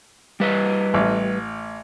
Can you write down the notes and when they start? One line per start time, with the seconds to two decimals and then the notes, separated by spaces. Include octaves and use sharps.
0.40 G3 B4 D#5
0.94 A1